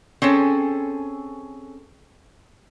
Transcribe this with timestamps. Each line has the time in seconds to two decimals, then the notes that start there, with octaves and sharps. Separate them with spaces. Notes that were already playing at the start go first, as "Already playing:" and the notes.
0.22 C4 C#4 G#4 A4